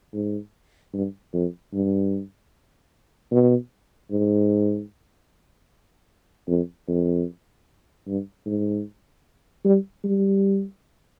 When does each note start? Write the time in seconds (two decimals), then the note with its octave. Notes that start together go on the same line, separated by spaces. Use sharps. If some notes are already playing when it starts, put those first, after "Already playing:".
0.13 G#2
0.93 G2
1.33 F2
1.73 G2
3.31 B2
4.11 G#2
6.48 F2
6.88 F2
8.07 G2
8.46 G#2
9.65 G3
10.04 G3